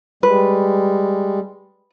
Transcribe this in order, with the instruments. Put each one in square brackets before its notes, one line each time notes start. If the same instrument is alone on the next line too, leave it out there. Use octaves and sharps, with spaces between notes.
[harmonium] G3 G#3 [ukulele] B4